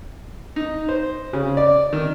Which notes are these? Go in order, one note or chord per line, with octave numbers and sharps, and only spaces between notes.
D#4
C5
C#3
D5
D#3